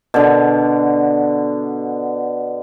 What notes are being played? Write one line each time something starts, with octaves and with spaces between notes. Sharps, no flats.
B2 D3